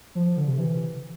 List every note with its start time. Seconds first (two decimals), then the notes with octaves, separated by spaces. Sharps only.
0.15 F3
0.26 F3
0.37 D3
0.47 C3
0.58 E3